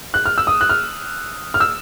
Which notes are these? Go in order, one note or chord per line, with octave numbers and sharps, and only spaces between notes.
F#6
F6
E6
D#6
F#6
F6
F6
E6